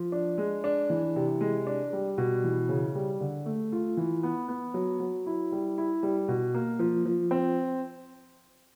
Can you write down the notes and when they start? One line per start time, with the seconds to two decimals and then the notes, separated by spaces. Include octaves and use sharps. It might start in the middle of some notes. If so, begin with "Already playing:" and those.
Already playing: F3
0.12 D4
0.38 G#3
0.64 D4
0.90 E3
1.16 C3
1.41 G#3
1.67 D4
1.93 G3
2.18 B2
2.44 E3
2.69 C#3
2.95 G3
3.21 D3
3.46 A3
3.72 F4
3.97 E3
4.23 B3
4.48 B3
4.74 F#3
5.00 F#3
5.26 E4
5.52 G3
5.78 E4
6.03 G3
6.28 B2
6.54 A#3
6.79 F3
7.05 F3
7.31 C4